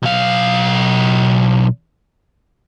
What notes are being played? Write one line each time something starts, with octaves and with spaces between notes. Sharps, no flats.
B1 F5